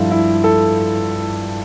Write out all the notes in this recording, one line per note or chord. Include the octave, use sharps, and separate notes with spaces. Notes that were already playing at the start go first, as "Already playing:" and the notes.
Already playing: G2 F3 E4 F4 A4
E4
A4